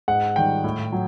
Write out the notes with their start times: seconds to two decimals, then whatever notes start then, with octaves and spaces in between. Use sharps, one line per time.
0.08 G#2 F#5
0.36 D#3 G3 G5
0.64 A2
0.92 F#3